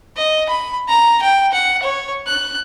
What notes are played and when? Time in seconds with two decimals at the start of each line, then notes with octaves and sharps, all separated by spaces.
0.17 D#5
0.49 B5
0.89 A#5
1.23 G5
1.52 F#5
1.83 C#5
2.27 F#6